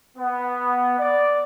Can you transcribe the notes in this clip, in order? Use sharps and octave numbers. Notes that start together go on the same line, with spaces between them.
B3
D5